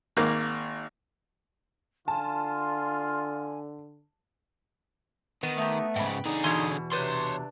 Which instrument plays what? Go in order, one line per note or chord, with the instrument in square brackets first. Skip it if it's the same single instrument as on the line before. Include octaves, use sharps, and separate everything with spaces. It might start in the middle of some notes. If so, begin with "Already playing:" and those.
[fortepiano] G#1 A#3
[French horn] D3 [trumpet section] F4 [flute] G#5 [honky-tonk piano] A5
[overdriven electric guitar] D#3 [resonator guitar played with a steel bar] B3
[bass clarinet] A3 [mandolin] D#4 G4
[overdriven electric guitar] G#2 C#3 [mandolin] G5 B5
[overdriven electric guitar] D3 G#4 [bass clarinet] D#4
[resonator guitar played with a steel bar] E2 B2 [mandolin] C#5 C6
[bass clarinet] C3 [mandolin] D4 B4 G6 [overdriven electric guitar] C#5 C6